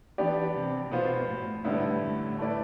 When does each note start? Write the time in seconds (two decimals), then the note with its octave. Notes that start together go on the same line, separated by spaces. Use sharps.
0.18 E3 B3 D4 G4 D5
0.54 C3
0.91 B2 B3 F4 C5
1.28 A2
1.65 A2 D3 G3 B3 E4
2.01 A2
2.38 A3 E4 B4 D5